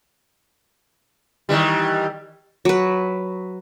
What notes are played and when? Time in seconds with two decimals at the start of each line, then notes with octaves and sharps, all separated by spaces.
1.49 D#3 E3 G3
2.65 F#3 B4